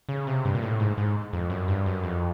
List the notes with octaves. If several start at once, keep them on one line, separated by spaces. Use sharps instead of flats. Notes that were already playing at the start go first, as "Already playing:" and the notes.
C#3
C3
G2
A#2
A2
G#2
G#2
F2
F#2
G2
F#2
F2